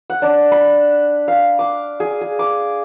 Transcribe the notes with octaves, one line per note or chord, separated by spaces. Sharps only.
F#5
D4
B5
F5
D6
G#4
G#4
D6